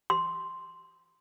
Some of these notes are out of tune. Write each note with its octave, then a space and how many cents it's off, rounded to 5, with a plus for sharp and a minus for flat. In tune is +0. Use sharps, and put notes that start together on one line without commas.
C6 -5